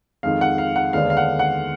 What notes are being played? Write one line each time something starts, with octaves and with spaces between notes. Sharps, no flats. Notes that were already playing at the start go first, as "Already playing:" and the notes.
F2 D#3 G#3 F5
F#5
F5
F#5
D#2 D3 G#3 B3 D4 F5
F5
F#5
F#5